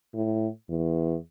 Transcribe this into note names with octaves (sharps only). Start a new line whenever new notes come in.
A2
E2